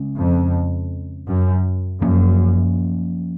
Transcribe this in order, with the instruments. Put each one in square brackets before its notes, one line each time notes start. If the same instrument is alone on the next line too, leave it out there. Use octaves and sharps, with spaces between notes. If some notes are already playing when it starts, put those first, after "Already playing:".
Already playing: [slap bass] C#3 G#3 C#4
[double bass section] F2
F#2
[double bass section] F#2 [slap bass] F3 A#3 C#4